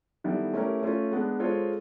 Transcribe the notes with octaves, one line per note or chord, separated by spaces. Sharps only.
D#3 G3 B3 E4 A4
A3 C#4 E4 G4 A#4
A3 C#4 F4
G#3 B3 D4
G#3 C4 F4 A4 C#5